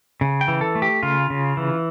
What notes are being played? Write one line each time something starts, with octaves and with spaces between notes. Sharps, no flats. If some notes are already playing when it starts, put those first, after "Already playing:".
C#3
G5
E3
A4
A3
G4
C#3 F4
C#3
E3